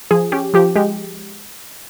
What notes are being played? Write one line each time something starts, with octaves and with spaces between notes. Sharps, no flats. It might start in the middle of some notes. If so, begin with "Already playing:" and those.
F3 G#4
C#4 G4
F3 G4
G#3 G4